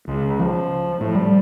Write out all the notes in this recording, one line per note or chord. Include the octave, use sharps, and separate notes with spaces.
C#2
F3
A2
G3